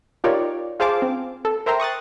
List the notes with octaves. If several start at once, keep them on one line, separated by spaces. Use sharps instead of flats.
D#4 F4 G4 A#4 C#5 D5
F4 G#4 C5 F5 A5 D6
C4
A4
A#4 C5 E5 G5 A#5 C6
C#6 D#6 F#6 A6